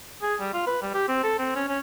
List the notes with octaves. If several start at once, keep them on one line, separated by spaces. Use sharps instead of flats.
G#4
G3
F4
B4
G3
G4
C4
A4
C4
C#4
C#4